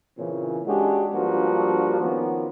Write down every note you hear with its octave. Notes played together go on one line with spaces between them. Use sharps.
A#2 C#3 E3 C4 C#4
G#3 C#4 D4 F#4 G4
G2 F3 A#3 D4 F#4
D#3 F3 A#3 B3 C#4